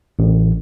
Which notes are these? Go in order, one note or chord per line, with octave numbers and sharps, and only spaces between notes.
A1